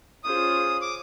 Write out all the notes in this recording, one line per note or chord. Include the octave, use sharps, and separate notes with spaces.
C#4 F4 G#4 C5 D#6
D6